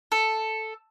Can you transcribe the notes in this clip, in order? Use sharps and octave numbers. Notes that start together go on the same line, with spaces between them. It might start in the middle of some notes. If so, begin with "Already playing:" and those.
A4